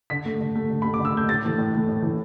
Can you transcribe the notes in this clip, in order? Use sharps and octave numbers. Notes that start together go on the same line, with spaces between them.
D3 B6
A3
D3
A3
D3
A3 B5
D6
D3
E6
A3 G6
A2 A6
E3 A3
A2
E3 A3
A2
E3 A3